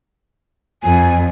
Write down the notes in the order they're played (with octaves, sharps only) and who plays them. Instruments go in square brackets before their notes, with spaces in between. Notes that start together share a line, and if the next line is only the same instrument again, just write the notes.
[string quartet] F2 [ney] G#5